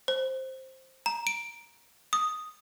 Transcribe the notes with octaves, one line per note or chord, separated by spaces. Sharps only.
C5
A#5
D7
D#6